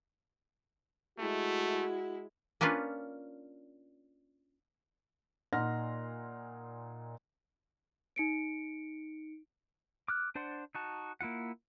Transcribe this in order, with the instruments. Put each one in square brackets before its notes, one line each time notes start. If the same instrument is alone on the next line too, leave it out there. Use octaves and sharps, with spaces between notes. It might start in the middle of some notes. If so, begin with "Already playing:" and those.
[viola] G#3 E4 [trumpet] A3 [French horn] F#4
[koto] A#3 C#4 D4 F4 B4
[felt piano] A#2 D#4 F#5 C6 F6 A#6
[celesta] D#4 C#7 D7
[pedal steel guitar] D6 F6 F#6
D4 C5 D5 F#5 C6
D#4 F#4 A5
A#3 E4 F4 F#5